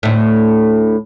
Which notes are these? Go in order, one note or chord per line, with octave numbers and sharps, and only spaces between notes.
D2 A2